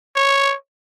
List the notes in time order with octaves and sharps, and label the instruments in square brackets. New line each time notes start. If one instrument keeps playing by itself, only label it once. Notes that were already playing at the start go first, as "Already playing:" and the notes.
[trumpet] C#5